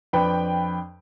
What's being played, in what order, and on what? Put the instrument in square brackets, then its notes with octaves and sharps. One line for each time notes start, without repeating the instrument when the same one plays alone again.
[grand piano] F2 D4 B4 G5 B5